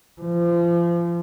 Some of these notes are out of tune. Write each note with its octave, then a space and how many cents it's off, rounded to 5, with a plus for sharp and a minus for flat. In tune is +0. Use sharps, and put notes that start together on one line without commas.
F3 -30